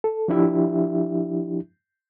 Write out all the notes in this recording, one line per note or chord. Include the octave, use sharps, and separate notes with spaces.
A4
F3 D4 E4 G4 E5